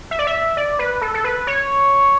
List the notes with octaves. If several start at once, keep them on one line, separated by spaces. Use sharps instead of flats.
E5
D5
E5
D5
B4
A4
A4
B4
C#5